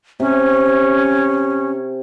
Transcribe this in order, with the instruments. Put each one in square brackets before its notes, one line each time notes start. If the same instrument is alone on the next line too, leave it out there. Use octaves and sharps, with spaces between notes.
[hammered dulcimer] C3 [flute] C#4